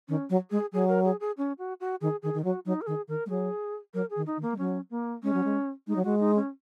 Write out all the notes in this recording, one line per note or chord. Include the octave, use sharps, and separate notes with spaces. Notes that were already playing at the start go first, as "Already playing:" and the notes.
D#3 C#4
F#3
G#3 G#4
F#3 G#4
A#4
G#4
G#4
C#4
F#4
F#4
D#3 G#4
D#3 G#4
D#3
F#3 F#4
F#3 D#4
A#4
D#3 G#4
D#3 A#4
G#3
F#3 G#4
F#3 A#4
G#4
D#3
D#4
D#3
A#3
G#3
F#3 C#4
A#3
G#3 C#4
F#3
G#3
G#3 D#4
F#3
G#3 F#4
D#4
C#4